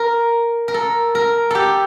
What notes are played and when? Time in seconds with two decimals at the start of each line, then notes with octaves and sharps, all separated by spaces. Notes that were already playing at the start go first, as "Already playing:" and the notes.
Already playing: A#4
0.68 A#4
0.74 A4
1.15 A#4
1.50 G4 A4